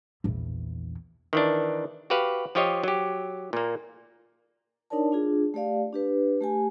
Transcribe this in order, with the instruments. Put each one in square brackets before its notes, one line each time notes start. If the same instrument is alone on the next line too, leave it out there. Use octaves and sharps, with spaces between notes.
[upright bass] A#1 E2
[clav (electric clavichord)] D#3 E3 D4
F#4 G4 B4 F5
F3 F4 G4 C#5 D#5
F#3 G4
A#2 A#3
[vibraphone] D4 D#4 A#4 C#5 D5 A5
D4 F4 G#4
A3 G4 D5 F5
D4 G4 B4
A3 G4 G#5